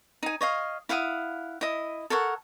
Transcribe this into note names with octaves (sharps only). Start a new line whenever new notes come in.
D#4 G#5
C#5 D#5 F5
E4 F5 F#5 D#6
E4 D#5
A4 A#4 C#5 F#5